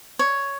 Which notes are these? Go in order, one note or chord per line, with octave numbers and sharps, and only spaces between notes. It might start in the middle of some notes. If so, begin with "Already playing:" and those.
C#5